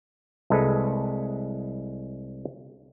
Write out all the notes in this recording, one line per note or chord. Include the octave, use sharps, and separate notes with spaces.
C2 G#3 A4 B4